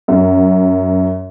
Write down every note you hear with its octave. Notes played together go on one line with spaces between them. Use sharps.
F#2